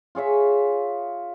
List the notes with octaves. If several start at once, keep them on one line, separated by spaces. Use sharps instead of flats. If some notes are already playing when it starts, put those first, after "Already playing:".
F4 G#4 C#5 E5